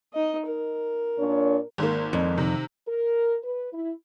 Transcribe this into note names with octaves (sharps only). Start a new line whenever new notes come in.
D#4 D#5
A#4
A#2 D4 C#5
G#1 A#3
F2
C3 D#3
A#4
B4
E4